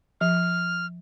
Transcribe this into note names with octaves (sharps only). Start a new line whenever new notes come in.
F3 F6